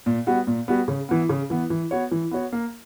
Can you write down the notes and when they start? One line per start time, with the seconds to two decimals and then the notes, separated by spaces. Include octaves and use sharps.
0.06 A#2
0.27 G3 B3 F#4
0.47 A#2
0.68 G3 B3 F#4
0.88 C#3
1.09 E3 B3
1.29 C#3
1.50 E3 B3
1.70 E3
1.91 B3 F#4 C#5
2.11 E3
2.31 B3 F#4 C#5
2.52 A#3